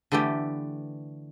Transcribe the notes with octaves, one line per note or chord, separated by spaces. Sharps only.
D3 E3 A3 B3 G4